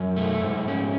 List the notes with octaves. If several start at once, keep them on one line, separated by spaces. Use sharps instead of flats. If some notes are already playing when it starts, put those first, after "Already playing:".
Already playing: F#2
A3
G#2
C#4